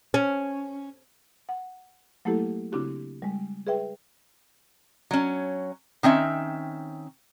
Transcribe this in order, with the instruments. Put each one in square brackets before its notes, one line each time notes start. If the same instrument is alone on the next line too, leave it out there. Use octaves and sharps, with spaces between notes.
[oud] C#4
[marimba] F#5
F#3 A3 A#3 E4 G4 A4
C#3 C4 D4 E4 F#4 G4
G3 G#3
G#4 B4 E5 G5
[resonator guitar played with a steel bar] F#3 C#4
D#3 C4 C#4 E5